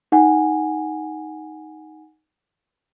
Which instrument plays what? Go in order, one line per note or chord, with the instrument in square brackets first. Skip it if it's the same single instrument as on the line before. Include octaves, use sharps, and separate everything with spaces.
[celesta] D#4 F#5 G#5